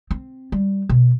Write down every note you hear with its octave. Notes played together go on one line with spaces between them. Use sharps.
C4
G3
B2